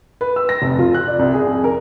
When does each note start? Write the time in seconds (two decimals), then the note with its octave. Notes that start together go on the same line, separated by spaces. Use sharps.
0.21 B4
0.36 E6
0.49 A#6
0.62 F1
0.79 F4
0.94 F#6
1.08 D5
1.19 C2
1.34 G#4
1.47 F2
1.64 A#4